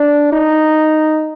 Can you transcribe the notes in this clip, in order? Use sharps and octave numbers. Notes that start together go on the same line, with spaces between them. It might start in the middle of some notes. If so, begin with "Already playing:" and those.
Already playing: D4
D#4